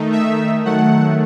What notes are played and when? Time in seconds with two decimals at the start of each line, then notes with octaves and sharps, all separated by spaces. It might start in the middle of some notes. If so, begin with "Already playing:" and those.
Already playing: D#3 A3 D#4
0.12 E5
0.65 D#3 F#3 A3 F#5